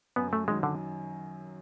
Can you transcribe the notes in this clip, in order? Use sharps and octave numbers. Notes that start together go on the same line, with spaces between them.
F#2 B3
A3
D#3 F#3 G#3
D3